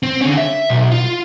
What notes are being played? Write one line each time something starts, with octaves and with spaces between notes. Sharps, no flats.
C4
D3 C#4
E5
B1
F4